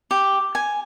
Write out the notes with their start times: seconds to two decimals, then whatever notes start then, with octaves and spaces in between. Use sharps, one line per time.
0.11 G4
0.55 G#5